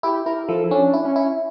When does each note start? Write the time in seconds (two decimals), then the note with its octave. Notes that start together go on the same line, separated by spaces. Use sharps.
0.03 E4 G4
0.26 E4 A#4
0.49 F3 A4
0.64 E4
0.71 C#4 D4
0.93 E4
1.05 C#4
1.16 E4